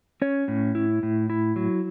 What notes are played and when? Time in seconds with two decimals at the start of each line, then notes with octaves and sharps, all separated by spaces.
0.22 C#4 C#5
0.48 A2
0.75 E4
1.03 A2
1.30 E4
1.56 F#3